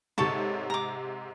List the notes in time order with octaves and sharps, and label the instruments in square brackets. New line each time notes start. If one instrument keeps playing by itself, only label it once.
[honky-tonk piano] G#2 C3 [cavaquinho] A4 C#5 A5
[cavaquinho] A#5 D6